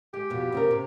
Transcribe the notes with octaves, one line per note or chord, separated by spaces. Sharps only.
G#3 G4
F2 B2
C#3 C4 A#4
C3